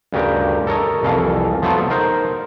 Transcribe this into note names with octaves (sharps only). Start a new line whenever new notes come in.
D2 G2 C#3 G4 A#4
A4 A#4 C#5 D#5
C2 F2 E3 A4 F5
F3 F#3 A3 B3 F4 A4
D#4 A#4 C5